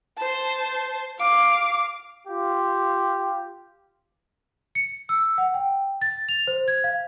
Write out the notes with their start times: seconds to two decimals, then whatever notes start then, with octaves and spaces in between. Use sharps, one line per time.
0.18 C5 A5
1.18 F5 D6
2.27 F4 G4
4.75 C#7
5.09 E6
5.38 F#5
5.54 G5
6.01 A6
6.29 F7
6.47 C5
6.68 G#6
6.84 F5